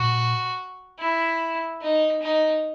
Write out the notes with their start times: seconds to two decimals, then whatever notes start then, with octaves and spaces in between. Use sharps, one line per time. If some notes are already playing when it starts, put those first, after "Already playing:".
Already playing: A#2 F#4
0.99 E4
1.81 D#4
2.22 D#4